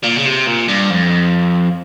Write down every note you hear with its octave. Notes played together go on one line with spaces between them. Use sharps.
A#2
C#3
C3
A#2
G2
F2